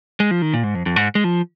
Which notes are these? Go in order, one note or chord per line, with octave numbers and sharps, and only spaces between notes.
G#3
F3
D#3
A#2
G#2
F2
F2
G#2
G#3
F3